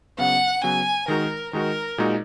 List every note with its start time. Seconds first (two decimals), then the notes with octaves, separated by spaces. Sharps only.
0.18 C#3 F#3 B3 F#5
0.63 C#3 F#3 B3 G#5
1.08 D#3 G#3 D#4 F#4 A#4
1.53 D#3 G#3 D#4 F#4 A#4
1.98 A#2 G#3 D#4 F#4